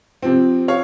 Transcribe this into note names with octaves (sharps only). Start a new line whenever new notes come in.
C3 F3 C4
C#5 F5